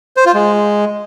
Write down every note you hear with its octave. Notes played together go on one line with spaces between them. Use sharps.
C5
F4
G#3